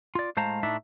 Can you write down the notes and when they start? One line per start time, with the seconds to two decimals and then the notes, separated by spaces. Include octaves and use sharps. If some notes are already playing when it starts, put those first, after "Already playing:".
0.15 F4 D5
0.37 A2 G#3 C5 F5 A5 A#5
0.63 A2 D4 D#4 E5